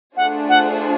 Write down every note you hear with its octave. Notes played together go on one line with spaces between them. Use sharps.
A3 D4 F4 G#4 C5 F#5
F#5